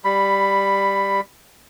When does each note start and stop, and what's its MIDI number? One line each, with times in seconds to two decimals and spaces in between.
0.05 1.20 55
0.05 1.20 83